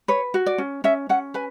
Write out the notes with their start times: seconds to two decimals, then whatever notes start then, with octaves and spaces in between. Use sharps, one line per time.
0.08 B4 C#5
0.34 F#4
0.46 D5
0.58 C#4
0.84 C#4 E5
1.09 C#4 F#5
1.34 B4 G#5